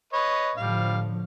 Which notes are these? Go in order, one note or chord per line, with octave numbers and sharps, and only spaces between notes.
B4 C#5 D#5
A2 D3 F3 G3 F5